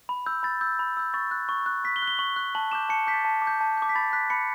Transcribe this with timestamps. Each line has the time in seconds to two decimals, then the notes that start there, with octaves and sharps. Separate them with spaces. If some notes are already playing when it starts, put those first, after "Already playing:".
0.09 B5
0.26 E6 G6
0.43 B5 A6
0.61 E6 G6
0.79 B5
0.97 E6 G6
1.14 C#6 A6
1.31 F#6
1.49 C#6
1.66 F#6
1.84 C#6 B6
1.96 G7
2.02 F#6
2.08 G7
2.19 C#6 F#7
2.36 F#6
2.55 A5 F#7
2.71 D6 G6 E7
2.89 A5 C#7
3.07 D6 G6 B6
3.14 A6
3.25 A5
3.42 D6
3.47 G6
3.61 A5
3.77 D6 G6
3.89 B6
3.95 B5 A6
4.13 F#6 B6
4.30 B5 C#7